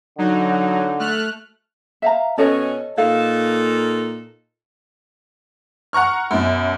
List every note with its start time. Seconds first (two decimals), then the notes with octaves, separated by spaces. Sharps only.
0.18 D3 F#3 D#4
0.99 A3 F6 F#6
2.02 E5 F5 A#5
2.38 B2 C#4 A4 C#5 D#5
2.98 A#2 D#4 A4 F5
5.93 F#5 A#5 C#6 F6
6.31 F#2 B2